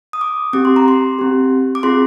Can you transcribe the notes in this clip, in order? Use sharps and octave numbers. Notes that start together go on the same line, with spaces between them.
D#6
D6
C4 G4 D6
C6
A#5
C6
C4 G4
D6
C4 F4 G#4 C6